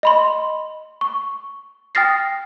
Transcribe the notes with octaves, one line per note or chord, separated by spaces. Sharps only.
D#5 B5 C6
C#6
G5 D#6 F6 A6 A#6 C7